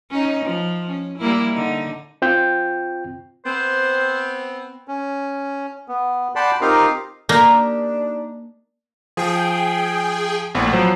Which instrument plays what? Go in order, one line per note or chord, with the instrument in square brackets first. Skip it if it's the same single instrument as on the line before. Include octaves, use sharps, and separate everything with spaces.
[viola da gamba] C#4 D#4
F3
C#4
G3 A#3 E4
D3 D#4
[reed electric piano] C4 F4 G5 G6
[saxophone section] B3 C4 [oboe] C5
[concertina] C#4
B3
D5 F#5 G5 A5 B5 C6
C4 D#4 F4 G4 A#4 F5
[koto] A#3 [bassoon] D4 [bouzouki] D#4 G4 A#5
[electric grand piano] F3 [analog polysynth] G#4 G5
[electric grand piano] A#1 A2 [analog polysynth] B3
[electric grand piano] F3 F#3 C5